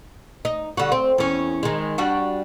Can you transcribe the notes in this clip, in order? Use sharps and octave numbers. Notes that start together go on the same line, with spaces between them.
D#4
D3 G3 F#4
C4
E2 C#4
D#3 G#3
G3 D4 F#4